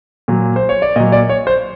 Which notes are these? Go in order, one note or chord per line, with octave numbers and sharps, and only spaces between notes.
A#2 F#3
C5
C#5
D5
A#2 F#3 D#5
D5
C#5
C5